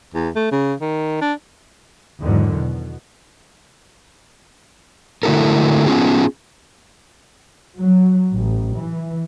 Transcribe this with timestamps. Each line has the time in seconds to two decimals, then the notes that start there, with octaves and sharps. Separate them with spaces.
0.14 E2
0.35 A3
0.52 C#3
0.80 D#3
1.21 D4
2.21 E2 G#2 D3 D#3 F#3
2.53 B2
5.23 D3 A3 E4 F#4 A4 A#4
5.86 B3 C#4 F4 G#4
7.77 F#3
8.34 A1
8.76 E3